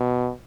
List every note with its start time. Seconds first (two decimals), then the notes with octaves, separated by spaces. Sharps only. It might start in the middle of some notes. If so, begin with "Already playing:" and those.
Already playing: B2